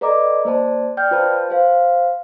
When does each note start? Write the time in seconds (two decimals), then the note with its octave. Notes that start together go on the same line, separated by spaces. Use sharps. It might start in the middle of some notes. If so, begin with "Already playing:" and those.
0.01 A4 B4 D5 D#5 A#5 D6
0.45 A#3 C5 D5 A5
0.97 D5 G5 F6 G6
1.11 F4 B4 C5 A5
1.50 C5 F5